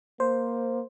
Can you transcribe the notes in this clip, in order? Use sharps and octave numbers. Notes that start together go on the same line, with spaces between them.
A#3 C5